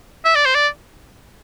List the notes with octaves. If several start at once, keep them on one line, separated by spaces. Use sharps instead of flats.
E5
D5
C5
D5